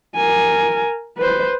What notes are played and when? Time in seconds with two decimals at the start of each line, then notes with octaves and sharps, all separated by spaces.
0.16 A#4 G#5
1.17 B4 C5